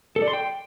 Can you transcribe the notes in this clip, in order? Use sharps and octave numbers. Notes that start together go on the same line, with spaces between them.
A4
D5
C6
G5